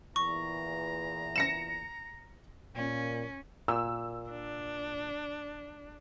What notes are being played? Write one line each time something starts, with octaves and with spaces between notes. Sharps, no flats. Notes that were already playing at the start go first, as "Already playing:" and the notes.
E2 A#2 E3 A#5 C#6
A#6 C#7 E7
A#2 C#4
A#2 E6
D4